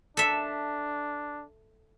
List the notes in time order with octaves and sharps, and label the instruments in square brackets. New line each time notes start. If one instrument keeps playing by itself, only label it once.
[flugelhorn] D4 [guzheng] A4 E5